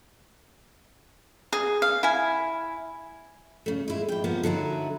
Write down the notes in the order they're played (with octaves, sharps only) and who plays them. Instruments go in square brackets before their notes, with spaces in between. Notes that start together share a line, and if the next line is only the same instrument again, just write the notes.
[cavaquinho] G#4
F5
E4 G#5
[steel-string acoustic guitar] C#3 A3
G#3 E4
G#2 G5
G2 F3 A#3 B3
D3 F#3 D#4 E4